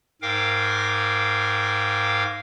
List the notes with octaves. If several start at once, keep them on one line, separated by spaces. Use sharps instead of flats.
G#2 A#4 F5 G5 D6